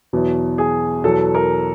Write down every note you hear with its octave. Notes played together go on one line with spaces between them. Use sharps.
E2 B2 F#3
G#4
E2 B2 F#3 A4
A#4